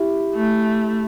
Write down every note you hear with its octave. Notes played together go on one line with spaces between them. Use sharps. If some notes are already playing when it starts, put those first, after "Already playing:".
Already playing: E4 G4
A3